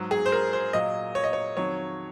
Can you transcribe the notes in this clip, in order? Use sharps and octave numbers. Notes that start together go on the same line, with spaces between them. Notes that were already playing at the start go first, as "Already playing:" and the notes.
Already playing: G#2 F#3
G#4
C5
A#4
C5
A#2 F#3 D#5
C#5
D#5
C#5
F2 D#3 F#3 C#5